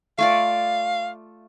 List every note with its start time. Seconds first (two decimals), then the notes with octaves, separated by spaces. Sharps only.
0.19 A3 F4 D5 F5